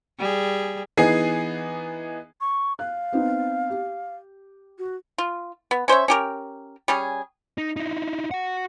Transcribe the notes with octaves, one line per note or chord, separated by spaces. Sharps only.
G3 G#4
E3 B3 D#4 G#4 G#5 C7
C#6
F5 F#6
B3 C4 D#4
G4
F#4
F4
B3
C#4 C5 C#5 E5
C#4 G4 A#4
G3 C#4 G#4
D#4
D#4 E4
F#4 F#5